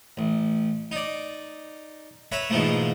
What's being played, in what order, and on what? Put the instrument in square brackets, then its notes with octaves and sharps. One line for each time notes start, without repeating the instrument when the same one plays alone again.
[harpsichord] A1
D#4 D5
B4 C#5 E5 A#5
G#2 B2 E3 F3 A3 A#3